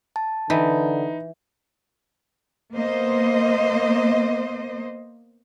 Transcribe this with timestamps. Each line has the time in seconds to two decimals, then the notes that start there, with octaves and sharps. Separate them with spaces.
0.16 A5
0.50 D3 E3 D#4 B5
2.73 A#3 B3 C5 D#5